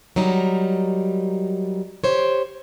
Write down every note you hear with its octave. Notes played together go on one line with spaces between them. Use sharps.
F#3 G3 D#4 A#4
G4 C5 C#5